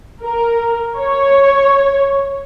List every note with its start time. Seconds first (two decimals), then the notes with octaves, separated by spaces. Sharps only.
0.22 A#4
0.97 C#5